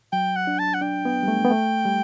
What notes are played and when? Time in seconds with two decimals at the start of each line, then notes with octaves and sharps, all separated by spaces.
0.12 F#3 G5
0.36 F#5
0.47 D4
0.59 A5
0.74 F#5
0.81 D4 G5
1.05 B3
1.23 G3
1.28 A3
1.45 B3
1.50 A3
1.85 G3